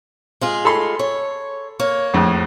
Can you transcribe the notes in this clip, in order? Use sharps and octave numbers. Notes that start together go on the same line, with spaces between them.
G#3 F4 G#4
A4 B5 C6
C#5
A#3 C#5
A#1 F2 A2